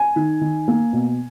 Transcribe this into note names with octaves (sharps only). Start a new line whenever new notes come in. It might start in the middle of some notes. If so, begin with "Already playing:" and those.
Already playing: G#5
D#3
D#3
A#3
B2